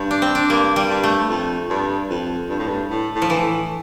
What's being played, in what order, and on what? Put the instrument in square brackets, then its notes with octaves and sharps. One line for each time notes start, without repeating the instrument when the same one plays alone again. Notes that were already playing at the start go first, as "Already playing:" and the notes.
Already playing: [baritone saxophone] G2
[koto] D4
C4
D4
[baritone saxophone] G2 [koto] A#3
[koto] G3
[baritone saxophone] G2
[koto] A3
[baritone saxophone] F2
G2
F2
G2
A2
G2
A2
A2
[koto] F3
E3
[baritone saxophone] A2